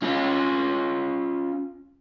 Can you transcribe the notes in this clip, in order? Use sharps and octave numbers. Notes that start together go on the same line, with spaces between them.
C#4 F4